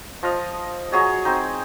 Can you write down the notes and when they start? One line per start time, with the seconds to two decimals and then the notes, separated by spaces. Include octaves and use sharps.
0.23 F3 D#5 F5
0.92 F#3 G#4 C#5 D#5
1.25 C4 D#4